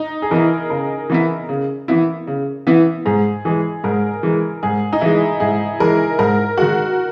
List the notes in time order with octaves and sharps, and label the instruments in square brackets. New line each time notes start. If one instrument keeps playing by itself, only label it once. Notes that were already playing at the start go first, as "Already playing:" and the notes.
Already playing: [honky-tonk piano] D#4
G#4
[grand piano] E3 B3 E4 [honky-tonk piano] A#4
[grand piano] C#3 [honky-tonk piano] A#4
[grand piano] E3 B3 E4
C#3
E3 B3 E4
C#3
E3 B3 E4
[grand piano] G#2 [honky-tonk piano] G#4
[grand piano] E3 G#3 [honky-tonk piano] G#4
[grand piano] G#2 [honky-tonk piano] A#4
[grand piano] E3 G#3
[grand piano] G#2 [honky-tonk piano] G#4
[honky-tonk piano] D#4
[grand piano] E3 G#3 [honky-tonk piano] E4
[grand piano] G#2 [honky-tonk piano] G#4
[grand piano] E3 G#3 [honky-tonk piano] A#4
[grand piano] G#2 [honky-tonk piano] A#4
[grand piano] D#3 G#3 [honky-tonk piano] F#4